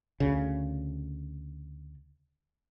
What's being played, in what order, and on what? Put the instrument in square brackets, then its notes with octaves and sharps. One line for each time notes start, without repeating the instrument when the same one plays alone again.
[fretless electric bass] D2 C#3